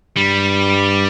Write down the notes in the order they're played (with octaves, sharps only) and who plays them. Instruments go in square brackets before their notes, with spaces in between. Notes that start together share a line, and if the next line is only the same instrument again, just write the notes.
[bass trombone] G2 [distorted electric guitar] G3